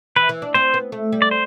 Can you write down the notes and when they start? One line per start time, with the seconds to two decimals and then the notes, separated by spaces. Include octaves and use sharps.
0.16 E3 B4
0.29 E3
0.42 D4
0.54 C4 C5
0.74 B3
0.92 A3
1.12 G3
1.22 D5
1.31 C5